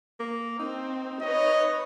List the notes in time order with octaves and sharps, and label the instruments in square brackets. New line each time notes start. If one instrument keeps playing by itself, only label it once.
[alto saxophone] A#3
[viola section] C4 [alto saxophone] D#4
[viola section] B4 C#5 [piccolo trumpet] D#5